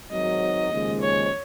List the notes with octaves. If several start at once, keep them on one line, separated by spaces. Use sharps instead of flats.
G#1 G#2 F#3 D#5
D#2 C#3 F3 G#3
C#5